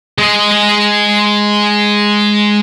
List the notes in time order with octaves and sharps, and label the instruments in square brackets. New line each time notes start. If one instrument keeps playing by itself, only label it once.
[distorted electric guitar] G#3 D#5